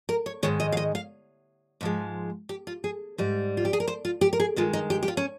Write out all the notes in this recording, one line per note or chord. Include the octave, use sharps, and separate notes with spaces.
A#4
C#5
G#2 D#3 G#3 C#5
D#5
F5
D#5
F5
G#2 F3 G#3
G4
F4
G#4
G#2 G3
F4
G4
G#4
A#4
C5
F4
G4
A#4
G#4
G2 D#3 G#3 F4
D#4
G4
G4
F4
C#4